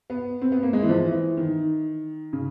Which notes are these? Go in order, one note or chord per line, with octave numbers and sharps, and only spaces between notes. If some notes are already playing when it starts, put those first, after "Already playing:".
B3
C4
B3
A#3
G#3
E3
F3
E3
D#3
C#3